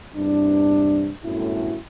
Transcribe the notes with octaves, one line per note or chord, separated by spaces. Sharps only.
E2 G2 C3 E3 D4
G1 F#2 A2 E4